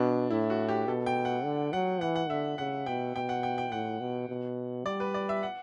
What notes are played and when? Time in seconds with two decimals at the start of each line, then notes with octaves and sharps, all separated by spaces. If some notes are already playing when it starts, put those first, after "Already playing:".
Already playing: B2 D4
0.30 A2 E4
0.50 F#4
0.68 G4
0.88 B2 A4
1.06 G5
1.25 F#5
1.44 D3
1.73 F#3 F#5
2.01 E3 F#5
2.16 F#5
2.29 D3 E5
2.58 C#3 F#5
2.86 B2 G5
3.15 B2 G5
3.29 F#5
3.43 G5
3.58 G5
3.72 A2 F#5
4.00 B2
4.29 B2
4.85 G3 D5
5.00 B4
5.14 D5
5.29 E5
5.43 F#5